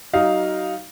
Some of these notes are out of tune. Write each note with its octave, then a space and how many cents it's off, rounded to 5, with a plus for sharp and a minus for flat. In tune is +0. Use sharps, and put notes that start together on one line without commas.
F#3 +30 D#4 +0 F5 +0